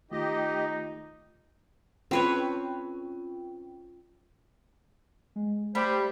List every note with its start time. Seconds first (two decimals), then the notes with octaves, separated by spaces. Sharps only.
0.11 D#3 A3 D#4 F4 G4 D#5
2.11 C4 C#4 F4 B4 C#5 G5
5.36 G#3
5.75 G3 A3 C5 B5